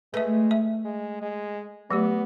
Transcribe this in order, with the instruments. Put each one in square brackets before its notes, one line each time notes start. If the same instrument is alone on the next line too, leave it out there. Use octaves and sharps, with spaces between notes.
[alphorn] G#3 [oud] A3 [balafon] B4 E5
[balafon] E5
[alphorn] G#3
G#3
[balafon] F#3 A3 G4 [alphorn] B3